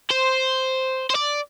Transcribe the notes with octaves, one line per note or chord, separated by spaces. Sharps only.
C5
C5
D5